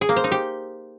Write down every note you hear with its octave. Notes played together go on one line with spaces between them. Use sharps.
G#4
A#3
C5
D#4
G4